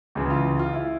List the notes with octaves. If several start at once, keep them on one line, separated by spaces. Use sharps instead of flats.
C#2 C#3 E3
F4
F4
E4